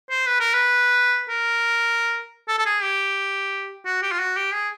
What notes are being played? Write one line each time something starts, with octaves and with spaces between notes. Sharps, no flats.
C5
B4
A#4
B4
A#4
A4
A4
G#4
G4
F#4
G4
F4
F#4
G4
G#4